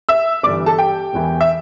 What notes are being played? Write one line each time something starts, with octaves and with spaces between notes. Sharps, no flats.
E5 E6
G1 G2 E3 D5 D6
A4 A5
G4 G5
E1 E2 E3
E5